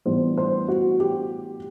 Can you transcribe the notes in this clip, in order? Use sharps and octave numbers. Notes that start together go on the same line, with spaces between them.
A2 E3 G3 B3 D4 C5
C5
F#4
G4